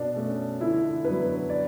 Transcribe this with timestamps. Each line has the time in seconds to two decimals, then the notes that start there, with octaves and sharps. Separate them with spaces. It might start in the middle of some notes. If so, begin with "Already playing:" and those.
Already playing: B2 D4
0.16 A3 C#4
0.60 D3 E4
1.05 F#3 B3 D4 B4
1.50 D5